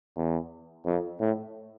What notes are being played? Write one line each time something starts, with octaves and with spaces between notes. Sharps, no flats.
E2
F2
A2